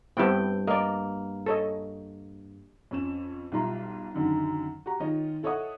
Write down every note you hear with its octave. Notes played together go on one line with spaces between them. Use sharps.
G2 B3 C4 E4 G5
A#3 D5 D#5
A4 C#5 D#5
F2 C#4 E7
B1 G3 E4 F4 A#5 C6
F#2 D3 D#3 D#4
F#4 G4 A#5
D#3 G#3 F4 C#5 D#5
E4 A4 C#5 D#5 F#5 D#6